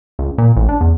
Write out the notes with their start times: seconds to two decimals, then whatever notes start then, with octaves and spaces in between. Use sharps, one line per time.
0.19 C#2
0.38 A#2
0.56 A1
0.69 D4
0.81 E2